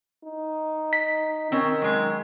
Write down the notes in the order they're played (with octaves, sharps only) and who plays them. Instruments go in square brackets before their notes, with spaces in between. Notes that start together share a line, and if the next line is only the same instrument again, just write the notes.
[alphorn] D#4
[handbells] B6
[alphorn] D#3 [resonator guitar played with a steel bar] C4 C#4
[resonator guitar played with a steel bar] F#3 G#3